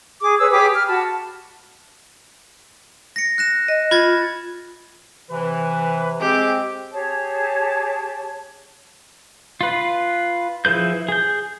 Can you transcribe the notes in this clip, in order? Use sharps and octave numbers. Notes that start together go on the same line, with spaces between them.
G#4 D6
G#4 B4 C#5 E6
G4 G#4 B5 D6
F6
F#4 A5 B5
A#6 C#7
F#6 A#6 E7
D#5
F4 B5 G#6 A6
C3 E3 B4
G#3 C4 G4 D6
G4 G#4 C#5 A5
F4 B4
F3 E4 G#4 B4 G6
G#4 G6